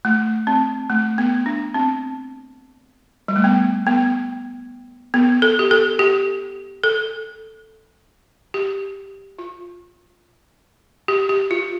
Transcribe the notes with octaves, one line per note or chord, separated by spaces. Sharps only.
A3
C4
A3
B3
D4
C4
G3
A3
B3
B3
B3
A4
G4
A4
G4
A4
G4
F4
G4
G4
F4